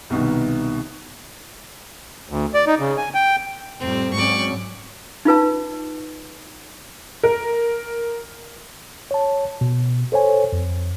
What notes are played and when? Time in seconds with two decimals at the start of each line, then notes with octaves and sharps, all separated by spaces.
0.10 C2 B2 D#3
2.30 D2
2.54 D5
2.67 D#4
2.80 C#3
2.97 G#5
3.14 G5
3.80 F2 A2 G3 C4
4.14 G#2 F#3 C4 C#4 D5 C#6
5.25 D#4 F4 B4 A5
7.23 A#4
9.11 C#5 A5
9.61 B2
10.12 A4 C5 C#5 G#5
10.53 F2